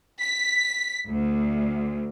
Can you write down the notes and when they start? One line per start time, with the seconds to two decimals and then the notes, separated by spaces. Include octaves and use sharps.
0.21 B6
1.09 D2